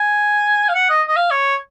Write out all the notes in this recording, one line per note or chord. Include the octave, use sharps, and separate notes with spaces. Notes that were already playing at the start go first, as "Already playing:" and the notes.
Already playing: G#5
F5
F#5
D#5
D#5
F5
C#5